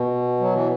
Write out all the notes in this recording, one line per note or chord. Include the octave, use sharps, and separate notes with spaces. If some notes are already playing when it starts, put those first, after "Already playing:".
Already playing: B2
F#3
E3